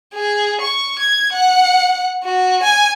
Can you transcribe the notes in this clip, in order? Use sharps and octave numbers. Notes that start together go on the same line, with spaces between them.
G#4
C#6
G#6
F#5
F#4
G#5